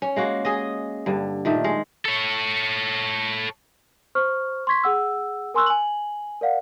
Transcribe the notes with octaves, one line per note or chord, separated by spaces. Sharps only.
C#4
G#3 A#3 F#4
G#4 D#5
G2 D3
A#2 D#3 A3
G#3
A4 C#5
C5 C#6 F6
C6 C#6 G#6 B6
G#4 F#5 E6
A#4 G#5 C6 C#6 E6 F#6
G#5 F#7
A#4 D5 F5 F#5